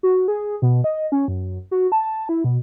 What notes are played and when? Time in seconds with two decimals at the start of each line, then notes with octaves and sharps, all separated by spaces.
0.03 F#4
0.28 G#4
0.62 B2
0.84 D#5
1.12 C#4
1.28 F#2
1.71 F#4
1.92 A5
2.29 E4
2.44 B2